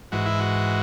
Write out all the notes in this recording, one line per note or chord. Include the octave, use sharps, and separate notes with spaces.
G#2 E3 F#4
E4
F#4